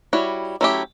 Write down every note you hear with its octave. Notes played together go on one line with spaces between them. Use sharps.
G3 E4 F#4 C#5
F#3 A3 C#4 E4 G4